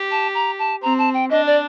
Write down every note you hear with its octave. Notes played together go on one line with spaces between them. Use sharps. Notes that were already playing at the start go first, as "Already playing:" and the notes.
Already playing: G4
A5
A#5
A5
C4 A#5
A5
G5
D4 D#5
D5